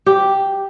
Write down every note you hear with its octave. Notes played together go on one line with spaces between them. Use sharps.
G4